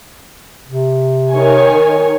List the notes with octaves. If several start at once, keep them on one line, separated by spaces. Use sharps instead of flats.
C3
D#3 C#5 G#5